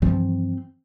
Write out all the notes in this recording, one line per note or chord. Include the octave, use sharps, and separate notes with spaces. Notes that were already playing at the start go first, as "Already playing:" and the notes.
G2 E3 F3 C4